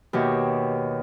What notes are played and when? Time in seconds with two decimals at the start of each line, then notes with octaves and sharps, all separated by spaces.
0.13 D#2 B2 G4 C#5 E5